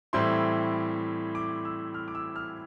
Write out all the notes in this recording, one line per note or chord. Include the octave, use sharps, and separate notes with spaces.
A2 E3 G3 C4 E4 C6
D6
E6
F6
D6
E6
F6